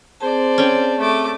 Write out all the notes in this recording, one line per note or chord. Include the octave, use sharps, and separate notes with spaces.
C4 G#4 C5 D5 A5
C#4 G5
A3 D6